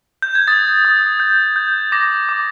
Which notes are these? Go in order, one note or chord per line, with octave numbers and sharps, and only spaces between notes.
G6
G#6
D#6 A6
D#6
G6
G6
D6 A#6
D6